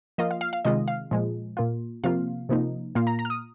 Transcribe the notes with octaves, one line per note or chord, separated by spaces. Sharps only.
F3 A#3 F4 D#5
F5
F5
F5
C3 D#3 G#3 F4 D#5
F5
A#2 F3 G#3
A#2 A#3 F4
C3 F3 A#3 F4 F5
C3 F3 A#3 D#4
A#2 A#3 F4 F5
A#5
A#5
F6
D#6